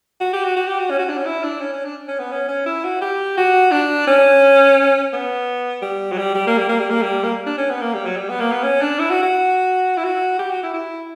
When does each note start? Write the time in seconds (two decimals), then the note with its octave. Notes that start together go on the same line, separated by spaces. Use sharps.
0.21 F#4
0.33 G4
0.45 F#4
0.57 F#4
0.68 G4
0.79 F#4
0.91 C#4
0.99 F#4
1.09 D4
1.18 C#4
1.26 E4
1.44 D4
1.61 C#4
1.73 C#4
1.85 D4
2.08 C#4
2.19 B3
2.32 C#4
2.49 C#4
2.66 E4
2.84 F#4
3.02 G4
3.38 F#4
3.72 D4
4.08 C#4
5.13 B3
5.82 G3
6.12 F#3
6.18 G3
6.35 G3
6.47 A#3
6.58 G3
6.69 A#3
6.80 G3
6.91 A#3
7.02 G3
7.24 A#3
7.47 D4
7.58 C#4
7.71 B3
7.81 A#3
7.94 G3
8.06 F#3
8.17 G3
8.29 B3
8.40 A#3
8.52 B3
8.64 C#4
8.82 D4
8.99 E4
9.10 F#4
9.23 F#4
9.97 E4
10.04 F#4
10.39 G4
10.50 F#4
10.63 E4
10.74 E4